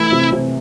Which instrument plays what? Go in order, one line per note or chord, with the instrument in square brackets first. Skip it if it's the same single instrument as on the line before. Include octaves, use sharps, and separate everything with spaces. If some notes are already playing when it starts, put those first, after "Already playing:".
Already playing: [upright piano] E3 A3 [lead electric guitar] E4
[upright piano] C3
C3